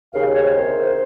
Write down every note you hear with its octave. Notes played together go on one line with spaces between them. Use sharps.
D#2 C#3 F5
C#5
C5
C2 C3 D#3